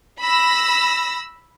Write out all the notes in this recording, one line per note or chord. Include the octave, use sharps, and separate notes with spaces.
B5 E6 A#6